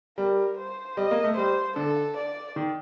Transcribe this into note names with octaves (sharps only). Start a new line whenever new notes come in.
G3 A#4
C5
G3 D#5
A#3
A3
G3 C5
D3 A4
D5
D#3